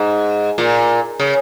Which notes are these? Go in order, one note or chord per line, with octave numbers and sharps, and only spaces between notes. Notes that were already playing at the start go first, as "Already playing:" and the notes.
Already playing: G#2
A#2
C#3